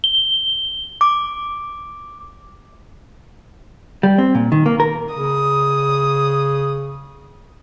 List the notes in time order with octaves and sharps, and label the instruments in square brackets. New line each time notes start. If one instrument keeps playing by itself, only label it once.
[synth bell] G7
[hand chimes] D6
[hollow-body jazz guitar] G3
C4
A#2
D#3
A#3
A#4
[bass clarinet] C#3 [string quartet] D#6